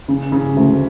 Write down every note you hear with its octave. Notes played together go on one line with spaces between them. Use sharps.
C#3
C#3
D2